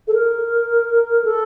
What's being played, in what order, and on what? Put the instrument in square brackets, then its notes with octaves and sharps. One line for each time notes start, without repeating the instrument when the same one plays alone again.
[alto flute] A4
A#4
A4